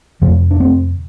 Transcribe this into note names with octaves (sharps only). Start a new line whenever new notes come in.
F2 C3 F3 A3
D4
A3 C4